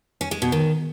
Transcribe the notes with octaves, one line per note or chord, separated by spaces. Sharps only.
C#4
G#3
B2
D#3